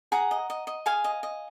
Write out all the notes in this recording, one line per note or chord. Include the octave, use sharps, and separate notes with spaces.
G#4 F#5 A#5
D#5
D#5
D#5
G#4 F5 G#5
D#5
D#5